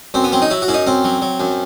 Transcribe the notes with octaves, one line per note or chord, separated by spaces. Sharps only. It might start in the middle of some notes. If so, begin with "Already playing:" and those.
F#2 C4
B3
F#3 C4
D#4
F#3 E4
F#4
F#2 E4
D#4
F#2 C4
F#3
F#3
F#2